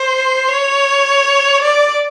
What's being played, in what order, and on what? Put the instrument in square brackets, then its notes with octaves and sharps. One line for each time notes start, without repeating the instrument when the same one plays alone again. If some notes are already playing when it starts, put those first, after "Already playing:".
Already playing: [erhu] C5
C#5
D5